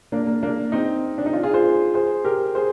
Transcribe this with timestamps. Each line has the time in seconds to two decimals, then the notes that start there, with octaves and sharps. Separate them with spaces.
0.12 A#3 D4
0.27 A#3
0.43 A#3 D4
0.72 C4 D#4
1.18 D4
1.26 D#4
1.33 D4 F4
1.43 F4 G#4
1.54 G#4 C5
1.94 G#4 C5
2.25 G4 A#4
2.55 G#4 C5